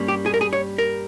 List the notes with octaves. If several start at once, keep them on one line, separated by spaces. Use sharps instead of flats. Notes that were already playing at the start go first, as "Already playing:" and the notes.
Already playing: G2 G3 A#3 C#4
G4
G#4
A#4
G#4
C#5
A#4